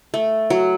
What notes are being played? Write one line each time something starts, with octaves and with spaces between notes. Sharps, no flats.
A3
F#3